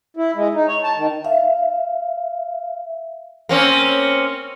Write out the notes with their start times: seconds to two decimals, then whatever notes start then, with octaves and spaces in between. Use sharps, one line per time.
0.17 E4
0.36 G#3
0.54 D#4
0.68 C#5
0.83 A5
0.96 D#3
1.25 E5 F5
3.49 A#3 C4 C#4